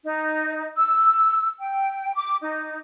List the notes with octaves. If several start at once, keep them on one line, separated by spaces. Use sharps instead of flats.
D#4
E6
G5
D6
D#4